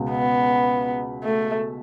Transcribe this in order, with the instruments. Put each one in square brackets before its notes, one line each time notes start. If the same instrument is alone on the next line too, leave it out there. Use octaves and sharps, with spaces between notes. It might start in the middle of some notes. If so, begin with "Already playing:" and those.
Already playing: [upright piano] C#2 B2 G#3
[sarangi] B3
A3